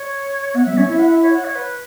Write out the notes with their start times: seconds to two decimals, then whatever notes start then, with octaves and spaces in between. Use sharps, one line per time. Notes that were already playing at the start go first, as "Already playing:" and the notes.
Already playing: C#5
0.54 B3 F#5
0.66 F#3 E5
0.73 B3
0.77 C#4 C#5
0.88 E4 E5
0.99 F#5
1.10 E5
1.23 C#5
1.33 F#5
1.44 C#5
1.55 B4